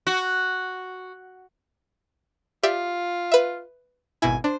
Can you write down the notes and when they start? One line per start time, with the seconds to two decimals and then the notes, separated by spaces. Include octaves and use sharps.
0.07 F#4
2.63 F4 G4 D5 E5
3.32 B4 E5
4.22 G#1 B2 E4 G#5
4.44 D4 C5